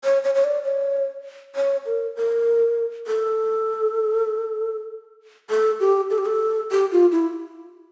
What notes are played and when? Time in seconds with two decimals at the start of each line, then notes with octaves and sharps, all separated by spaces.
0.04 C#5
0.24 C#5
0.35 C#5
0.44 D5
0.65 C#5
1.56 C#5
1.86 A#4
2.16 A#4
3.07 A4
5.50 A4
5.80 G4
6.11 A4
6.18 G4
6.26 A4
6.71 G4
6.92 F4
7.12 E4